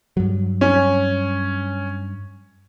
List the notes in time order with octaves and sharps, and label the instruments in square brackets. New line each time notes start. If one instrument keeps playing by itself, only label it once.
[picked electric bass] G2 F#3
[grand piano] C#4